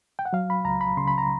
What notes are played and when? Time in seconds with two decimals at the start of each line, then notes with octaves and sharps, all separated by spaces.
0.19 G5
0.25 F#5
0.33 F#3 F5
0.50 B5
0.65 C#2 A#5
0.81 B5
0.97 C#3 C6
1.08 B5
1.18 A#5